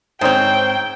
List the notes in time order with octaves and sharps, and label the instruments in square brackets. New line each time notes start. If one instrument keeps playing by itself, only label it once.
[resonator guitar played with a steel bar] G#2 C4 [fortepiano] C5 C#5 [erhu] G5